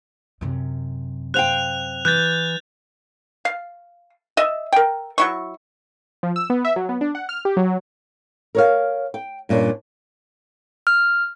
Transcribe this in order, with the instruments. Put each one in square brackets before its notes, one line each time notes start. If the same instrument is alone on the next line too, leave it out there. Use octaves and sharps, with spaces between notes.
[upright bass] F#2 C3
[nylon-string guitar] C5 F5 G5 [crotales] F#6 F7
[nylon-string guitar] E3 [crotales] F#6 G6 A6
[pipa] F5
D#5 E5
A#4 G5
F#3 E4 C#6
[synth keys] F3
E6
B3
E5
F#3
B3
D4
F#5
F6
G4
F#3
[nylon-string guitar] A#4 C#5 F5
G5
G2 A#2 C#4 D4
[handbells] F6